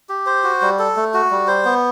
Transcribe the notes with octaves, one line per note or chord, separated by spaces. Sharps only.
G4
C5
F#4
G3
A4
A3
F#4
G3
C5
B3